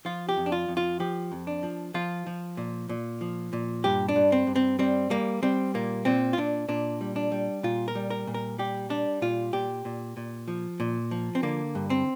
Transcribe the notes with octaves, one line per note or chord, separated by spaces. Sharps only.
F3 F4
G4
F2
D4
F4
F2
F4
F3 G4
F2
D4
F3
F3 F4
F3
A#2
A#2
F3
A#2
G2 G4
D4
G2
C4
G2
C4
G3 C4
G3 A#3
G3 C4
A#2 A#3
A#2 C4
F4
A#2 D4
A#2 D4
G3
D4
G3
A#2 F4
A#4
G3
A#4
A#2
A#4
G3 G4
G3 D4
A#2 F4
A#2 G4
A#2
A#2
F3
A#2
F3
C4
D3 A#3
G2
C4